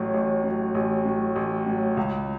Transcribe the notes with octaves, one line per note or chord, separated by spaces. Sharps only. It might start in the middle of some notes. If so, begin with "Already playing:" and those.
Already playing: A1 A2 F#3
A1
A2 F#3
A1
A2 F#3
A1
A2 F#3
C#2